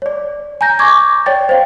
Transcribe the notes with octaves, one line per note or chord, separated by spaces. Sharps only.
C#5 D5
G#5 A#5 G6 A#6
C#6 D6 G#6
C#5 D5 G5 A6
C5 F5 G5